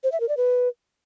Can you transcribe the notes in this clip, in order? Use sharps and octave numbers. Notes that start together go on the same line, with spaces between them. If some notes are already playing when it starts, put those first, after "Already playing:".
C5
E5
A#4
D5
B4